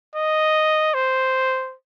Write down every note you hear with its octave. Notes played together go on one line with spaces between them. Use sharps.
D#5
C5